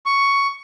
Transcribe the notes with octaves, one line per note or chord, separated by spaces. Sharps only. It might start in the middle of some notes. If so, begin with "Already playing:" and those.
C#6